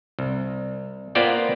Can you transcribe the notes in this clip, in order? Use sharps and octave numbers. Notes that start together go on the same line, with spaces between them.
C2
A#3 B3 F4 C5 D5 G5